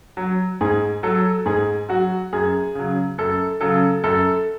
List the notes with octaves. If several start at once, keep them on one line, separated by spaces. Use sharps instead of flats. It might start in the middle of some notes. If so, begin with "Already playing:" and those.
F#3
G#2 G#4
F#3 A4
G#2 G#4
F#3 F#4
F#2 G#4
C#3 F#3
F#2 A4
C#3 F#3 A4
F#2 A4